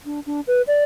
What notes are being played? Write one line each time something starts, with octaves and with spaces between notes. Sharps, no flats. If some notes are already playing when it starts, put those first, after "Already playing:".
D4
D4
B4
D5